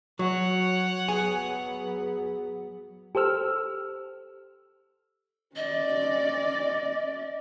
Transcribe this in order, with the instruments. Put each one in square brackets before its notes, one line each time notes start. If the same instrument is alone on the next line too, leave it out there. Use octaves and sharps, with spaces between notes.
[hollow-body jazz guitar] F#3 [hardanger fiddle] C#5 F#5
[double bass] F#3 B3 [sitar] G#4 [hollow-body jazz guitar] G#5
[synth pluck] G4 A4 C5 E6 F6
[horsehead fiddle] C#4 D5 [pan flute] D#5